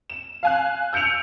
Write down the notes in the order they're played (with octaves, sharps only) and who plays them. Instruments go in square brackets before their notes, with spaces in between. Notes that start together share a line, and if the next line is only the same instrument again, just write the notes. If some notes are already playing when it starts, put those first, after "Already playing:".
[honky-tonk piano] E7
F5 G#5 F#6
E6 G6 C#7 D7 F7